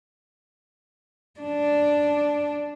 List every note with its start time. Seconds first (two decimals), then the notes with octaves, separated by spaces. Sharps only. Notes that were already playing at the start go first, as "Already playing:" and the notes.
1.40 D4